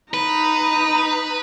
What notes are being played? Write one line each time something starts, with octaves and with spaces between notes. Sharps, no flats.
D#4 B4 A#5